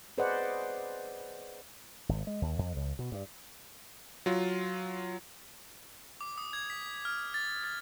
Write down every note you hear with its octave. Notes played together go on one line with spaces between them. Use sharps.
G#4 B4 C5 D5 D#5 F#5
G#1
G#3
D#2
F2
C#2
B2
G2
F#3 F4
D6
D#6
G#6
B6
F6
A6
A6